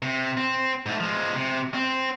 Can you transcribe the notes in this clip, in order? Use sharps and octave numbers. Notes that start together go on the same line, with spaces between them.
C3
C4
G#2 A3
F3 G#3
C3
C4